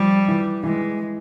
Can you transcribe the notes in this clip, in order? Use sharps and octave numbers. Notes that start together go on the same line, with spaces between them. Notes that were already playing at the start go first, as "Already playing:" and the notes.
Already playing: F3 G3
E3
E3 G#3